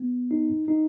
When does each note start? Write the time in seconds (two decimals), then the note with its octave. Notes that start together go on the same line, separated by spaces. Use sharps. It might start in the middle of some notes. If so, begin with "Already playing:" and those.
Already playing: B3
0.31 D#4
0.68 D#4